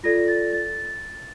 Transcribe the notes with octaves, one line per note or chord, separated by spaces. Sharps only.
F4 A4 D5 A#6
A6
A6